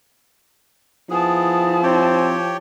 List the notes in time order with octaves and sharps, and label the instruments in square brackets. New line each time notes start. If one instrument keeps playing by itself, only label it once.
[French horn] F3 [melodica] B3 G#4 [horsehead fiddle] E4 A5
[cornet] C4 [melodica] G4 C#5 G5